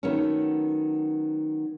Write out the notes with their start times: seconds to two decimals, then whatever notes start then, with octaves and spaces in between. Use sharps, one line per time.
0.03 D#3 F#3 A3 B3 C#4